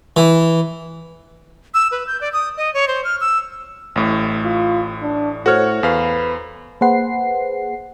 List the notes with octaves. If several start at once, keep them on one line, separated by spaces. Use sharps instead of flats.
E3
E6
B4
G6
D5
D#6
D#5
C#5
C5
F6
E6
A1 A2
F4
D4
A2 F#4 A4 C5 C#5 F6
E2 B4 F5
A#3 G#4 B4 C5 F#5 C7